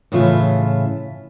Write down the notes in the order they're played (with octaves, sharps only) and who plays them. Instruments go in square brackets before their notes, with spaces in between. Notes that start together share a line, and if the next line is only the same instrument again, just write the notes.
[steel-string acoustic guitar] A2 C#3 E3 F4 G4 E5